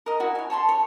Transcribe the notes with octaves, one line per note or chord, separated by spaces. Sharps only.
A#4 D#5
E4 F#4
C#5 G#5
C#5 A5 B5 C6
C#5